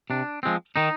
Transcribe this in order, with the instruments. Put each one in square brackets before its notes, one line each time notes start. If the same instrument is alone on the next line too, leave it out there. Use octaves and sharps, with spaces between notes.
[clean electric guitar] C3 D4
F3 G#3 C4
D#3 D#4